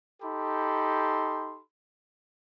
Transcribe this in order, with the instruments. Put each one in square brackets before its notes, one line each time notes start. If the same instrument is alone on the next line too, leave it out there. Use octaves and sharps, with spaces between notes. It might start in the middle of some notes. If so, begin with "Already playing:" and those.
[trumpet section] D#4 G4 A4 B5 C6